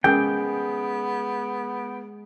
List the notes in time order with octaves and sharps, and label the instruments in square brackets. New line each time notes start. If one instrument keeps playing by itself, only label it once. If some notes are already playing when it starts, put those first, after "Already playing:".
[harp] G#3 [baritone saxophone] B3 [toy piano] C#4 G#4 A#4 [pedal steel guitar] G5